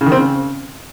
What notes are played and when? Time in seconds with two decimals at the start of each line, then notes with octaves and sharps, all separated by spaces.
0.01 C#3
0.06 D#3
0.12 C4
0.17 C#3